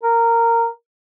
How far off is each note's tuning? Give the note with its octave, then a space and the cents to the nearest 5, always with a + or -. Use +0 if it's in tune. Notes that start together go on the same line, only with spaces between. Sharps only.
A#4 -15